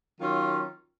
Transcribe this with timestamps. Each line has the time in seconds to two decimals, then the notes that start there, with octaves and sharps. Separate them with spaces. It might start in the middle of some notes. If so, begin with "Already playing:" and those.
0.19 D#3 F#3 C#4 F4